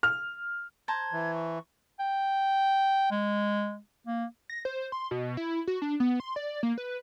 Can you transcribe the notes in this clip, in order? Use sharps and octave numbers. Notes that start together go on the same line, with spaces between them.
F6
C5 A5 A#5 G#6
E3
C#6
G5
G#3
A#3
A#6
C5
C6
B2
E4
F#4
D4
B3
C6
D5
A#3
B4